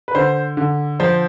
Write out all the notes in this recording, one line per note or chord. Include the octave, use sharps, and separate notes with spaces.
B4
D3 C5
D3
F3 C5